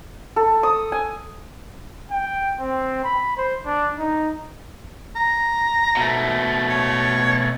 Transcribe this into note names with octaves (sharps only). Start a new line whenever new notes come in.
A4
D#6
G#5
G5
C4
B5
C5
D4
D#4
A#5
B2 A3
C#5